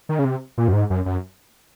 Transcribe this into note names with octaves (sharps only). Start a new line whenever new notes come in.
D#3
C#3
C3
A#2
F#2
G#2
F#2
F#2